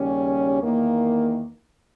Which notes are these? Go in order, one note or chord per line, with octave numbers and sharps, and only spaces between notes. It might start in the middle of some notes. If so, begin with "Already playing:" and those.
Already playing: D#2 C#3 G3 C#4
E2 D#3 A#3